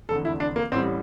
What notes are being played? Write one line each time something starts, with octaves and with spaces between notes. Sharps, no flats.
F1 E2 D3 A4
E4
D4
A#3
A1 A2 G3 C4